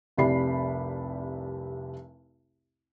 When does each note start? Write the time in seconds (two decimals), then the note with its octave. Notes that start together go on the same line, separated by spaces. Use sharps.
0.17 F1 C2 G4 D5 B5 C7